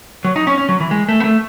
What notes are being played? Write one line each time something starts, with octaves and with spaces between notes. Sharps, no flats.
F#3
D#4
C#4
C#4
F#3
E3
G#3
A3
B3
A3